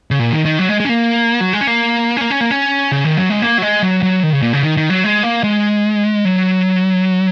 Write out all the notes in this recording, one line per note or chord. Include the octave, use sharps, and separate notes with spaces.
C#3
A#2
D#3
D#3
F#3
G#3
G#3
C#4
A#3
F#3
G#3
C#4
A#3
C#4
A#3
C#4
A#3
C#4
C#3
D#3
F#3
G#3
A#3
F#3
G#3
F#3
F#3
D#3
C#3
A#2
C#3
D#3
D#3
F#3
G#3
A#3
G#3
F#3